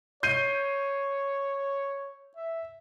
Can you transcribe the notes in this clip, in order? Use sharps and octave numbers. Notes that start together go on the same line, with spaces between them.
C#5 G6 C7 D#7
E5